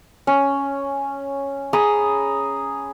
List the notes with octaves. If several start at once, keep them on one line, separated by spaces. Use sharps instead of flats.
C#4
G#4 A#5 B5 D#6